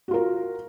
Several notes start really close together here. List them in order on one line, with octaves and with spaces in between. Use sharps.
F#4 F4 A#4